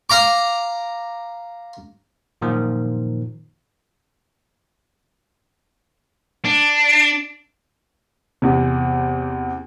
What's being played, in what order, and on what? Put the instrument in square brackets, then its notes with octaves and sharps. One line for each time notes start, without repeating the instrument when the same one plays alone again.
[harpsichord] F5 A#5 D6
[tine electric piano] F#2 A#2 D#3 F3
[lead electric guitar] D4
[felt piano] E2 C3